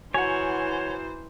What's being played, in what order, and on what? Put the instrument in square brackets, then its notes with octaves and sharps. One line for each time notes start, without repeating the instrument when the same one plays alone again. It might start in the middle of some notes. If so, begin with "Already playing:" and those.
[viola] E3 C5 [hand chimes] F#4 A#5 [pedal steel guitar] C#5 [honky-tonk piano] F#5 G#5